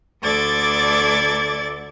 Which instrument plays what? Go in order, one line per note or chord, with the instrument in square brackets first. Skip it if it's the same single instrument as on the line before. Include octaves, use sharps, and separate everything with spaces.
[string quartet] D2 A4 D5 D6 G#6 A6